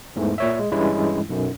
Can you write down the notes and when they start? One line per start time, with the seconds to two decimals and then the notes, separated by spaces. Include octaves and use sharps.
0.16 E2 G#2 E3 A3
0.38 A#2 C#5 E5
0.59 G#3
0.72 G2 E3 G3 G#3 C#4 E4
1.30 B1 F#2